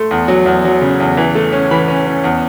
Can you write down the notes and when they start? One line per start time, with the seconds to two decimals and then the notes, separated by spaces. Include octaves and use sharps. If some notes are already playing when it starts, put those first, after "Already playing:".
Already playing: A3 C6
0.11 E2
0.28 F#3
0.46 E2
0.65 F#3
0.81 C#3
1.00 E2
1.17 E3
1.35 A3
1.53 C#4
1.71 E3 B5
1.88 C#4
2.07 C#4
2.24 E2